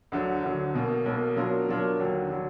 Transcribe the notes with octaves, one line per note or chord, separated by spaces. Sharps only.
D2 D3 F#3
D2 D3 F#3
B1 B2 A#3
B1 B2 A#3
B2 F#3 D4 F4 A#4
B2 F#3 D4 F4 A#4
D#2 D3 F#3
D3 F#3